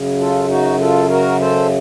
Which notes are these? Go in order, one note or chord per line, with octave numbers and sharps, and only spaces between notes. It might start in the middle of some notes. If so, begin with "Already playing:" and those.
Already playing: F#2 C#3
F4 A4
D#4 F#4
F4 A4
F#4 A#4
A4 C5